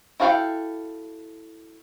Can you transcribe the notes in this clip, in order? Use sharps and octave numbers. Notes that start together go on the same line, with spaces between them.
E4 F#4 A4 F5 G5